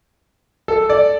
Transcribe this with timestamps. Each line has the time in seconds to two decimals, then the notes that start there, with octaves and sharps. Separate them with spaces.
0.68 A4
0.89 D5